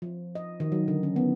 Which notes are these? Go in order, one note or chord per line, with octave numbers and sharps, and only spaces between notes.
F3
D#5
D#3
F#3
D3
C#4
B3